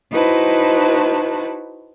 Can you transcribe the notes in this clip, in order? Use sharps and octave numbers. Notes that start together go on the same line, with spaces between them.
D#4 E4 F#4 B4 C5 A5